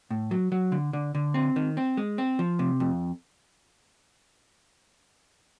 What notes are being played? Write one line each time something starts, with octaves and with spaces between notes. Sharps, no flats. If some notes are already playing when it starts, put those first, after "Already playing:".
A2
F#3
F#3
D3
D3
D3
C4
D#3
C4
G#3
C4
F3
C3
F2